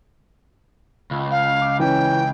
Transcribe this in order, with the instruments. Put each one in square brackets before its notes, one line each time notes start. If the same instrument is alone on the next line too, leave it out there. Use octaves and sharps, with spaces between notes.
[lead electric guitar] C#2
[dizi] F5
[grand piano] D6
[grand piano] E3 C#4 [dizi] G5